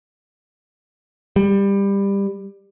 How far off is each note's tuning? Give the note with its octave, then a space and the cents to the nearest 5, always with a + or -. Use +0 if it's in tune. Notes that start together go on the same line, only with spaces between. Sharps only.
G3 +20